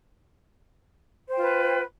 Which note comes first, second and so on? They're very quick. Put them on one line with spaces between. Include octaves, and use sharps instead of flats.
C5 G5 F4 B4